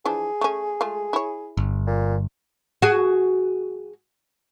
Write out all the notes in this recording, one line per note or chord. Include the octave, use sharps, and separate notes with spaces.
E3 F3 D4 G#4
A3 C#4
G#3 A3 F4
E4 C#5
G1
A#2
F#4 G#4